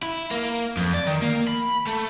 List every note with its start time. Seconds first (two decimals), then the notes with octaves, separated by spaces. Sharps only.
0.03 E4
0.31 A#3
0.77 F2
0.94 D5
1.07 D#3
1.22 A#3
1.48 B5
1.87 A3